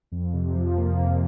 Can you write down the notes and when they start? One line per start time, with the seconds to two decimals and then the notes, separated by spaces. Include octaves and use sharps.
0.12 F2
0.33 C3
0.55 F3
0.77 A#3
1.00 F2